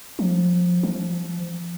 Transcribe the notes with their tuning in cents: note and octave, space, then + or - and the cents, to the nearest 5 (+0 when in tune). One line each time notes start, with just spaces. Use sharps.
F3 +20
F3 -20